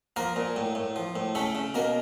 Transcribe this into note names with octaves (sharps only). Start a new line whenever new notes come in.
F3 A#3 A#4
A#2
A2
A2
F3
A2
C#3 A3 A4
C#3
B2 A#3 A#4